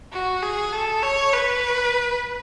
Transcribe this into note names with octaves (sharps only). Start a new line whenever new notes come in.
F#4
G#4
A4
C#5
B4